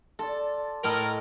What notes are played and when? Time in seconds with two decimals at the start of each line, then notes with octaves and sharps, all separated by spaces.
0.19 F4 A4 D5
0.84 A2 A4 A#4 D#5